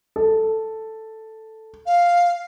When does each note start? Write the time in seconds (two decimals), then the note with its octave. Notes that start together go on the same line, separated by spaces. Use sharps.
0.16 A4
1.86 F5